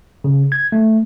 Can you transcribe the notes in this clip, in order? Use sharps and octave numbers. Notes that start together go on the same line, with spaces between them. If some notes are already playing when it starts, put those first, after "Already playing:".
C#3
G#6
A3